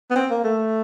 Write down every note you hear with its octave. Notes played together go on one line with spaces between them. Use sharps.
B3
C4
A#3
A3